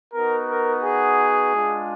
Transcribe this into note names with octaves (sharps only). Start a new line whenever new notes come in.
B3 D#4 F#4 A#4
A#4
G#4
G#3 D4 F4